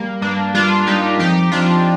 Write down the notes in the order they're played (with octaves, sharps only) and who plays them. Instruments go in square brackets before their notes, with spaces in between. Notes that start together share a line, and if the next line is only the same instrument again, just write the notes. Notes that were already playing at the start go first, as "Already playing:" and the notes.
Already playing: [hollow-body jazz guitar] G3 [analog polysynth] A#3
[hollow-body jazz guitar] G2 [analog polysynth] A#3 D4
[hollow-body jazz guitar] G3 [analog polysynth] D4 F4
[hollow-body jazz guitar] G2 [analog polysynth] D#4 G4
[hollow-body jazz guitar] F2 [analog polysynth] D#4 G4
[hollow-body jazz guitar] F2 [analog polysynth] D4 F4